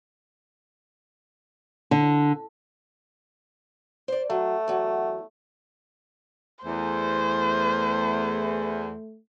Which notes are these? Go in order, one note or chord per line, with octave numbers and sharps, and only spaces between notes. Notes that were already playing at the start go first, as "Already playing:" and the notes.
D3
C5 D5
F#3 A3
E2 F#3
E2 A3 C5